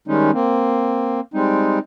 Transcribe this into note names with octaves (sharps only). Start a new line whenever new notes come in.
D#3 G3 G#3 C#4 D#4
A#3 C4
G3 G#3 C4 D#4